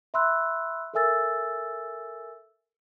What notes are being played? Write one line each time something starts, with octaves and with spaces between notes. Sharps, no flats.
E5 B5 C6 E6 F#6
A4 A#4 E5 G#5 E6 A6